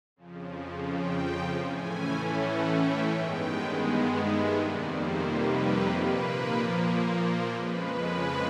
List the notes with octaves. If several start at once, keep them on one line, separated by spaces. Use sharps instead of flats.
F2 C#3 F3
G5
A2 E3 A3 C#4 G#5
F#5
G5
G2 D#3 G#3 B3 G5
F5
E5
F2 C3 D#3 G3 A#3 D5
C5
B4
A#2 F3 A#3 B4
A#4
C5
F2 C#3 F3 G#3 B4